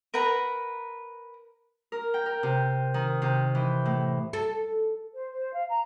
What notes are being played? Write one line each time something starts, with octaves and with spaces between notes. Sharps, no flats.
A#4 B4 F#5 A#5
A#4
G5
A#4
C3
D#3
C3
E3
A2
A4
C5
C5
F5
A#5